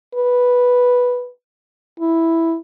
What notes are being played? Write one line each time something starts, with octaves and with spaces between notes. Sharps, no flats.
B4
E4